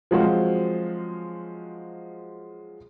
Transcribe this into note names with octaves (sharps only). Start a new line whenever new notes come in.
F3 F#3 G#3 C4 F4 F#4